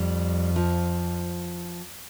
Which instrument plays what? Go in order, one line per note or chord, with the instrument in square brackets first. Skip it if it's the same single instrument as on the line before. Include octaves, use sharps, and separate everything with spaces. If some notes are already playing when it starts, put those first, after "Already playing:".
Already playing: [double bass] F2 [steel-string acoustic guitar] G3
[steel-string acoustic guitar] F3